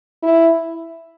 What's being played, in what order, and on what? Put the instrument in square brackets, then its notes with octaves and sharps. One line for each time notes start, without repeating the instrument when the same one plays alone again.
[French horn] E4